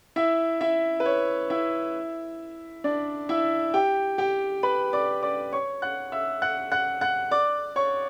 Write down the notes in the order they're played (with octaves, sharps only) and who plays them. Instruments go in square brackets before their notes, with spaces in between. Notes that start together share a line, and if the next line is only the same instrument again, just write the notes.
[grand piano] E4 E5
E4 E5
B4
C#5
E4 E5
D4 D5
E4 E5
G4 G5
G4 G5
B4 B5
D5 D6
D5 D6
C#5 C#6
F#5 F#6
E5 E6
F#5 F#6
F#5 F#6
F#5 F#6
D5 D6
C#5 C#6